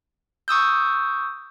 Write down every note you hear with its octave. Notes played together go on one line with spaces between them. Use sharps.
C#6 D#6 E6 G6